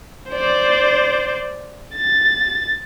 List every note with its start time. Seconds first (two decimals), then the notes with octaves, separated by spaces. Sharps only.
0.30 C5 D5
1.96 A6